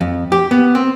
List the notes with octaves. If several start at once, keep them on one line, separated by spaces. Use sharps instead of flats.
F2
G4
B3
C4